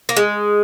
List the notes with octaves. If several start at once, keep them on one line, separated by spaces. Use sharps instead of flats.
A#3
G#3